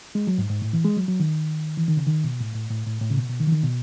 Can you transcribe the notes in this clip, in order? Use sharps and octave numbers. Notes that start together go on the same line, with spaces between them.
G#3
F#3
G#2
G#2
A2
E3
G#3
F#3
F#3
D#3
E3
D#3
C#3
D#3
B2
A2
A2
A2
A2
A2
C#3
B2
B2
D#3
E3
D#3
B2